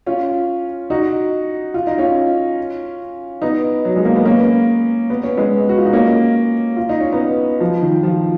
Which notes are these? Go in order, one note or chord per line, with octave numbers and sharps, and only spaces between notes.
C#4 F4
D#4 F#4
F4
D#4
C#4 F4
B3 D#4
F#3
G#3
A#3
B3
A#3 C#4
B3
C#4
G#3 B3
F#4
F4
D#4
A#3 C#4
F4
D#4
C#4
B3 D#4
F3
D#3
F3